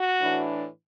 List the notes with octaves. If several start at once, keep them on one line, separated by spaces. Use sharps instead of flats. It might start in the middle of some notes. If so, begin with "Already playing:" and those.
Already playing: F#4
A2 E3 D4